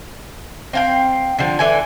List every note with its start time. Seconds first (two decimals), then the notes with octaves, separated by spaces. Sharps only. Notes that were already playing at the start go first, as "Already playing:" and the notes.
0.73 C4 F5 G5
1.39 D3 F3
1.59 D3 E3 G#5